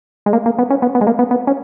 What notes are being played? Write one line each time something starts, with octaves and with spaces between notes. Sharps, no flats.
G#3
A#3
A#3
B3
C#4
B3
B3
G#3
A#3
B3
B3
C#4